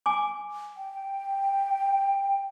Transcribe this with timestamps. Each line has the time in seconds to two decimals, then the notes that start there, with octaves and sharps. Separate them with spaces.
0.06 G#5 D6
0.77 G5